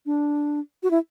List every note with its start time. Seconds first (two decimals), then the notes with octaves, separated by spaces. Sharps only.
0.06 D4
0.83 F#4
0.91 E4